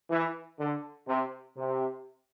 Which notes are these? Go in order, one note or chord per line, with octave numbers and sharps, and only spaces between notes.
E3
D3
C3
C3